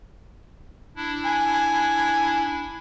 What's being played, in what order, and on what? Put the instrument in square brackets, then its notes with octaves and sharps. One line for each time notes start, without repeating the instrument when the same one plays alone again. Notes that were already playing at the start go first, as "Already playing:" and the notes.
[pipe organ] D4 E4
[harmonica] G#5